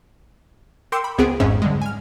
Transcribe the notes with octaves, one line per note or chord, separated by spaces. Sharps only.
A#4 G5 C6 D6 E6 C#7
B5
C#2 B3 C4 G#4 D7
G#1 F2 G#2 C#4 E5
D3 G3 G#3
G#5 F6